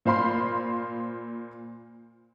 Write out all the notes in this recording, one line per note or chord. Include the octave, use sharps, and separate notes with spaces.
A#2 C5 F5 B5 C6 C7